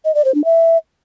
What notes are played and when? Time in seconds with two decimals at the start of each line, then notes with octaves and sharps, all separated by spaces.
0.05 D#5
0.15 D5
0.25 C5
0.35 D4
0.44 E5